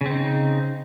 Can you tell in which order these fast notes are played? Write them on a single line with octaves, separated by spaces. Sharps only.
C#3 C4 D#4